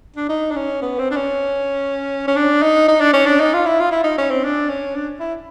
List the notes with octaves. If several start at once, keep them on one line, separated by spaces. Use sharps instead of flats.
D4
D#4
D4
C#4
B3
C4
D4
C#4
C#4
D4
D#4
D#4
D4
C#4
D4
D#4
F4
E4
F4
E4
D#4
C#4
C4
D4
C#4
D4
E4